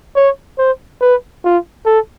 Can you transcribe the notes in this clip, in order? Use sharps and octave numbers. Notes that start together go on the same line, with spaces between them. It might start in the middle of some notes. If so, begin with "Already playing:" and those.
C#5
C5
B4
F4
A4